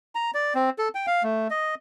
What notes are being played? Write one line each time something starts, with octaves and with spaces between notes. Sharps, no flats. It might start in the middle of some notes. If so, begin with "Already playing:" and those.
A#5
D5
C4
A4
G5
F5
A3
D#5